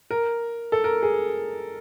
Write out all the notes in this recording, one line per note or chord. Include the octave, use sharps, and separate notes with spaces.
A#4
A4
A#4
G#4